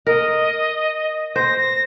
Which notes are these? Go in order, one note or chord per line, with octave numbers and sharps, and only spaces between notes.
A#4 D#5
C5 A#6
A#6